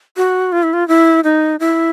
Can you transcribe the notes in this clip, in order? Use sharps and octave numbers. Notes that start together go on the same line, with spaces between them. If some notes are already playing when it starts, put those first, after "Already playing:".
F#4
F4
E4
F4
E4
D#4
E4